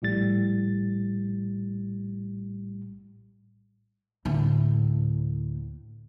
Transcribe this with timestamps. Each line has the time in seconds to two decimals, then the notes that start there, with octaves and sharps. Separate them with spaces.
0.02 A#1 A2 G3 A6
4.25 D2 A2